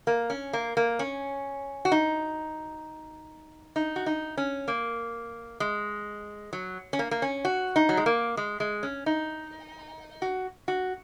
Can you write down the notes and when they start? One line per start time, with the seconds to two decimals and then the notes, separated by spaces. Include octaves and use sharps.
0.07 A#3
0.30 C#4
0.53 A#3
0.77 A#3
0.99 C#4
1.85 F#4
1.92 D#4
3.76 D#4
3.96 F#4
4.06 D#4
4.37 C#4
4.68 A#3
5.60 G#3
6.53 F#3
6.93 C#4
6.99 A#3
7.11 A#3
7.22 C#4
7.45 F#4
7.76 D#4
7.89 F#3
7.97 G#3
8.06 A#3
8.37 G#3
8.60 G#3
8.83 C#4
9.06 D#4
10.22 F#4
10.68 F#4